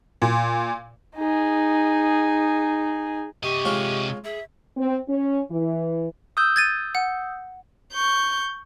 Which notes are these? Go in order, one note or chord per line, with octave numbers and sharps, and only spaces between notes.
A#2
D#4 G#4
C3 G4 D#5 C#6
G#3 F4 C#5
G#4 E5
C4
C#4
E3
D#6 E6 G6
G#6 A6 D#7
F#5
C#6 G6